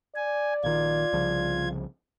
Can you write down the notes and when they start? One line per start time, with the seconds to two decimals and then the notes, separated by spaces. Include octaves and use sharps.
0.15 D5 G#5
0.64 A#1 D#3 F4 G#6
1.13 C2 C#3 F3